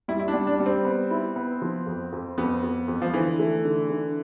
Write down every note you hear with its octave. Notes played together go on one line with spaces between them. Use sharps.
G3 E4
E4
D4
G3
D4
G3
C4
B3
E4
B3
F3
F2
F2
F2 B3
F2
F2
F3
D3 E3
A3
D3
D3